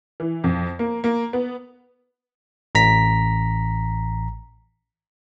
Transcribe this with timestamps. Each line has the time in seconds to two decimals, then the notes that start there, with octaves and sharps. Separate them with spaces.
0.20 E3
0.44 F2
0.79 A#3
1.04 A#3
1.33 B3
2.75 A1 A#5 B6